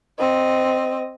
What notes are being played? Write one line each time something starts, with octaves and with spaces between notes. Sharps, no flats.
C4 D#5